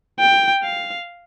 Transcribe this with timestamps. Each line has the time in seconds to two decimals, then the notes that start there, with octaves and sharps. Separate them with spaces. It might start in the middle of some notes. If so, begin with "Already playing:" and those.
0.20 G5
0.64 F5